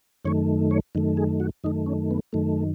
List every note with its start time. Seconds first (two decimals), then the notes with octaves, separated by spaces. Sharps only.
0.25 F#2 D#3 A3 C#5
0.71 C#5
0.95 F#2 D#3 A3
1.17 G#4
1.40 F#4
1.64 F#2 D#3 A3 D#4
1.86 C#4
2.11 B3
2.33 F#2 D#3 A3